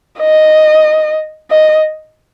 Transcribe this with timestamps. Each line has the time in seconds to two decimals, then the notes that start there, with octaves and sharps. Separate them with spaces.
0.20 D#5
1.51 D#5